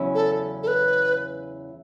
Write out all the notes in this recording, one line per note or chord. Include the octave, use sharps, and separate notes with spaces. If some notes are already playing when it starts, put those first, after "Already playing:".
Already playing: E2 C#3 F#3 C#4 E4
A4
A4
B4